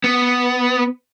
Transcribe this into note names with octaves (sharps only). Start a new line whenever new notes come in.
B3